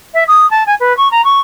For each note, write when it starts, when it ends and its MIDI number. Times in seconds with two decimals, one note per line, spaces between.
0.14 0.24 76
0.28 0.49 87
0.51 0.64 81
0.67 0.75 80
0.80 0.95 71
0.97 1.08 85
1.11 1.22 82
1.24 1.40 85